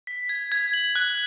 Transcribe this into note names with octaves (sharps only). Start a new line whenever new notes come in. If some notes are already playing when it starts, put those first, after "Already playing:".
B6
G#6
G#6
F#7
F#6